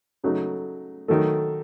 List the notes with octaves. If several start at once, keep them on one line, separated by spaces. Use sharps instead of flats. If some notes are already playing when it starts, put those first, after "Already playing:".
C#3 F#3 A3 D#4
D#3 F#3 A3